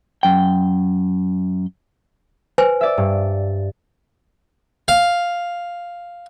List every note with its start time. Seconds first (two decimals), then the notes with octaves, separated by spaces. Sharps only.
0.23 F#2 G5
2.58 B4 C5 G#5
2.81 D5 E5
2.97 G2
4.88 F5